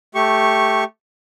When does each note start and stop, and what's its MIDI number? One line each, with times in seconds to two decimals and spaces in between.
0.15 0.84 57
0.15 0.84 67
0.15 0.84 85